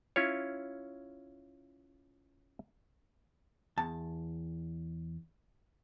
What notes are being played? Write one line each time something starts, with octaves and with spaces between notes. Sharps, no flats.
C#4 E4 F4 C#5
E2 A5